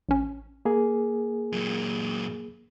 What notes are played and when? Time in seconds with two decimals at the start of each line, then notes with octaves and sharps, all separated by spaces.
0.09 A1 C#4
0.65 A#3 G#4
1.52 F#2 A#2